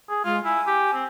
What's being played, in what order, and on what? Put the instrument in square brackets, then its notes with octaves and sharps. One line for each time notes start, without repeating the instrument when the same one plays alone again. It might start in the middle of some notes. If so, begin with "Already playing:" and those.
[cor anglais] G#4
[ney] G#3 [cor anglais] F4
[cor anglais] E4 [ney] G#5
[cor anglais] G4
C4